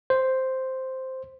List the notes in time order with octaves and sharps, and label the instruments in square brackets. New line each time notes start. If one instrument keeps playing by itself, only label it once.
[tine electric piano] C5